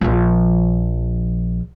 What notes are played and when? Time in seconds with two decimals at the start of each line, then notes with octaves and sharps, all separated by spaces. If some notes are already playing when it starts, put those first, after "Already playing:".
0.01 A#1 F3